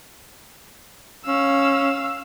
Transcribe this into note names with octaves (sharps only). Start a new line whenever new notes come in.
C#4 F5 E6